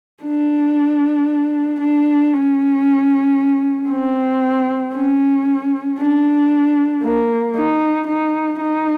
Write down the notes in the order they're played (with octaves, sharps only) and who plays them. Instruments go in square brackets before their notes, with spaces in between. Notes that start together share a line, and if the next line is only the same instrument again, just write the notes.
[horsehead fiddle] D4
D4
C#4
C4
C#4
D4
A#3
D#4
D#4
D#4